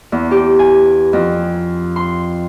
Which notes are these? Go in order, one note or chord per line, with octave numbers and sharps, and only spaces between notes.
E2
G4
G#5
F2
C6